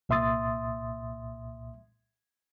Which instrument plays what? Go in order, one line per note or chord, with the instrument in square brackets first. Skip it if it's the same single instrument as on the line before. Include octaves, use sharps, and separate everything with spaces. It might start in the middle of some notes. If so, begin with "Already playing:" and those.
[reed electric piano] C2 A#2 E5 C6 D#6 A6